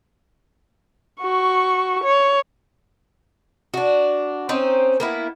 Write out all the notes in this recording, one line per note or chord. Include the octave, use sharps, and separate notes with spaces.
F#4 C#6
C#5
D4 F#4
C4 C#4 D#4 C5
A#3 B3 E4